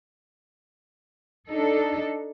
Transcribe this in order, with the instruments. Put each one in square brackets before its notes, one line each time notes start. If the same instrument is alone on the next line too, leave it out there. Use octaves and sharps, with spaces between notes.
[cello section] D4 D#4 A4